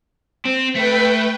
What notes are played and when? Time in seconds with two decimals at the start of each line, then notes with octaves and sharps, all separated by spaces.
0.45 C4
0.75 A3 B4 G5